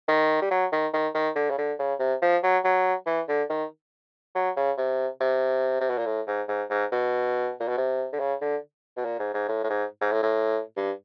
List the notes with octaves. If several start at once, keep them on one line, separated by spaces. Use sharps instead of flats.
D#3
G3
F#3
D#3
D#3
D#3
D3
C#3
D3
C#3
C3
F3
F#3
F#3
E3
D3
D#3
F#3
C#3
C3
C3
C3
B2
A#2
A2
G#2
G#2
G#2
B2
A#2
B2
C3
D3
C#3
D3
B2
A#2
G#2
G#2
A2
A2
G#2
G#2
A2
A2
G2